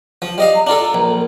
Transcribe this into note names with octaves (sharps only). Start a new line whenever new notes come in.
F3
G3 D#5 F5
A#5
D4 F4 A4
A#1
A#4